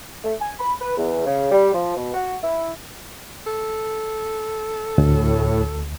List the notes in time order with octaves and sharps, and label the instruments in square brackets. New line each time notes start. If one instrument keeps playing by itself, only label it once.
[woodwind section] A3
G#5
B5
B4
E2
C#3
G3
F3
B2
F#4
E4
[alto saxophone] A4
[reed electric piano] D2 [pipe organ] A2